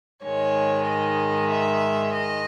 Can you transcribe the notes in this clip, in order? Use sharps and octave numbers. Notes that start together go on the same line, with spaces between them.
G#2 D#3 G#3 C#5
D#5
E5
D#5